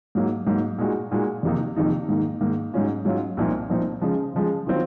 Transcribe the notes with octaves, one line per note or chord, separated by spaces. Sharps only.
G#2 F#3 A#3
G#2 F#3 A#3
A#2 G#3 D#4 F#4
A#2 G#3 D#4 F#4
F2 C3 D#3 A#3 D#4
F2 C3 D#3 A#3 D#4
G#2 D#3 A#3
G#2 D#3 A#3
G#2 F#3 C#4 F4
G#2 F#3 C#4 F4
C2 A#2 F3 C4 D#4
C2 A#2 F3 C4 D#4
C#3 F3 G#3
C#3 F3 G#3
D#3 F#3 C4 F4